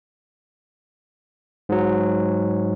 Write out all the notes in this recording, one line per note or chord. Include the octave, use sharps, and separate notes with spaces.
G#2 F#3